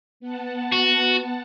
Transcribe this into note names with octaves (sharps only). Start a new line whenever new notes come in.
B3 F#5 A5
F#4